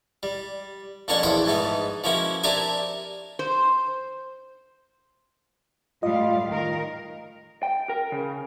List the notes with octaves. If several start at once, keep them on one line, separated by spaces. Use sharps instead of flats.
G3
F2 A#3 C#4 D4 F#5 C#6
A#1 E2 C5 F#5 G5 B5
G#2 A3 B3 D#4
F3 A#3 C#4 E4 F#4
C4 D4 G4 A#4 E5 G#5
C5
A2 G3 F4 D#5 F5
D#3 A#4
G5
A#4
C#3